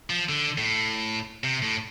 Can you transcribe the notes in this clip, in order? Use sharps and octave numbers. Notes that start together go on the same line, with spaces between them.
F3
D3
A2
C3
A2